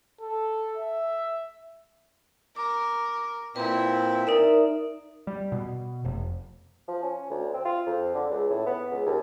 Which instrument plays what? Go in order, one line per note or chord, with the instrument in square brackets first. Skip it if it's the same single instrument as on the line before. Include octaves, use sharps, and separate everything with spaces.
[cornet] A4
E5
[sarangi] A#4 [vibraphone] D6
[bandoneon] A#2 C4 [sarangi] E4 [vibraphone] B4
[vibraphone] D#4 D5 E5 [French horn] A#4
[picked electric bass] G3
B2
F1
[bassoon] F3
C#4
D2
C4
F4
F2
D3
C#2
A2
B3
C#2
D#2